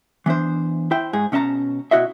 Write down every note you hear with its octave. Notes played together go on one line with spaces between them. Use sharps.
E3 B3 D4 C5
E4 C5 G5
G#2 G#4
B2 C#4 D#5 A5 A#5
B2 E4 F#4 D#5 E5